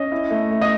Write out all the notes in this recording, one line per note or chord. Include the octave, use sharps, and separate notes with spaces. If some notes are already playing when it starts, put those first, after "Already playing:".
Already playing: C#4 D#5
E4
A3
A3
D#5